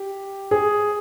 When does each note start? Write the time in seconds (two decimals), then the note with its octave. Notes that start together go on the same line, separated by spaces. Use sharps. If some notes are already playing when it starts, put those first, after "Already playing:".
Already playing: G4
0.51 G#4